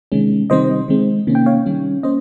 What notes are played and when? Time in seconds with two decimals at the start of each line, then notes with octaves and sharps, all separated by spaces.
0.12 C3 D#3 G#3 C#4
0.50 C3 D#3 G3 C4 C5 D#5
0.88 D#3 G#3 C4
1.27 C3 D#3 A#3 C#4
1.35 G5
1.46 C#5 F5
1.66 D#3 G3 C#4
2.03 A#3 C#4 C5 D#5